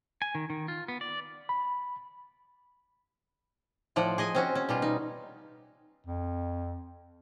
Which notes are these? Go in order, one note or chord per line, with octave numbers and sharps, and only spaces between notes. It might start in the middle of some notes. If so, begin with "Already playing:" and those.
G#5
D#3
D#3
F4
B3
D5
B5
A2 F3 D5 F#5
G#4 D#5 G#5
C4 C#4 F#4
C#4
B2 G3 F4
D#4
F2